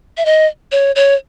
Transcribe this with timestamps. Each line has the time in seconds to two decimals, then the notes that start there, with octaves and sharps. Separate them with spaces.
0.17 E5
0.25 D#5
0.72 C#5
0.96 C#5